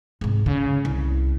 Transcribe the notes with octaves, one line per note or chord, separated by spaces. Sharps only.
G#2 C3
C#3
C2